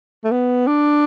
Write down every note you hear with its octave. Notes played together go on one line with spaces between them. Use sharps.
A3
B3
D4